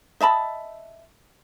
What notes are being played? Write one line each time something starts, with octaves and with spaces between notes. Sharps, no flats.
D#5 E5 A5 B5